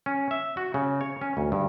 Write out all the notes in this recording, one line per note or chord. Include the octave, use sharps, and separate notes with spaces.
C#4
E5
F#4
C#3
C#5
C#4
D2
G2